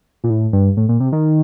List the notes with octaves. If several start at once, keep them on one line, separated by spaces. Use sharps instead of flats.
A#2
A2
G2
A2
A#2
C3
D#3